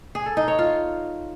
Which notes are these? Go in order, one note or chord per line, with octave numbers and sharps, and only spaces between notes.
G#4
A4
D#4
C#5
F4